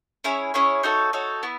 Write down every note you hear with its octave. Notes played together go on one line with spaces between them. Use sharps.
C#4 E4 G#4 C#5
C#4 E4 G#4 C#5
D#4 F#4 A4 C#5
D#4 F#4 A4 C#5
B3 E4